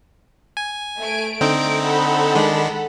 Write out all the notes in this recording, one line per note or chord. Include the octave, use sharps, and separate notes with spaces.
G#5
A3 D7
D3 C4 D#4
A4 F#5 B5
D#3 G#3 D4